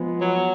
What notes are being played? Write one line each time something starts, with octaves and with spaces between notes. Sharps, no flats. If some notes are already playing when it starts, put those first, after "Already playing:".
Already playing: F3 G#3 B3
F#3